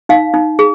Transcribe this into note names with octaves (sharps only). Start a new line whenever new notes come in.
D#4 F5
D#4
G#4